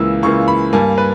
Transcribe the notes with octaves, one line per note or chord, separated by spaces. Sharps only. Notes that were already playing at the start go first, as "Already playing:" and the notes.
Already playing: C#2 C#3 E3 A#3 E6
C#2 C#3 E3 A#3 C#6
B5
G2 G3 A#3 G#5
B4